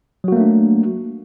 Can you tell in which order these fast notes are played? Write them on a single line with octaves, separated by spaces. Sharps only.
F#3 F#4 A#3 A3 D4